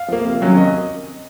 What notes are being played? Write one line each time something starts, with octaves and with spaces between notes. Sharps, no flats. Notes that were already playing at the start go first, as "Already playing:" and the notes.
Already playing: F5
F3 A#3
C3
D#3 F#3 C#4
C3 D#5